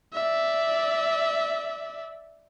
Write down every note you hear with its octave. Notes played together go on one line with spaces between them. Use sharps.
D5 E5